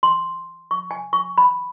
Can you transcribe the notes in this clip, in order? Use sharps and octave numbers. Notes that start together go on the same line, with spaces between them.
C6
C#6
G#5
C#6
B5